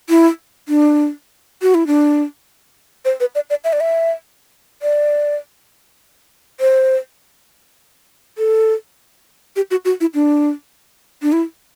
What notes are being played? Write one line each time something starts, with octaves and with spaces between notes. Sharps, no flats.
E4
D4
F#4
E4
D4
C5
B4
D5
D5
E5
D5
E5
D5
C5
A4
G4
F#4
F#4
E4
D4
D4
E4